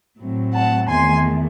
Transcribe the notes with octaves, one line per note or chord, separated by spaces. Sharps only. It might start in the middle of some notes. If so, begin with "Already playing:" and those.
A2 F#3 A3 C4
F#5 A5
E2 D#3 A3 G#5 C6